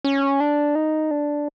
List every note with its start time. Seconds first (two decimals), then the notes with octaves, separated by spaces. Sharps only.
0.05 C#4
0.40 D4
0.75 D#4
1.11 D4